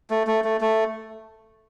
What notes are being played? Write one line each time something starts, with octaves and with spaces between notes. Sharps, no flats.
A3
A3
A3
A3